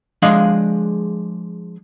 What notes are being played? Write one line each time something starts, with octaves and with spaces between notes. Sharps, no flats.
F3 G#3 D4 G#4 D#5 F5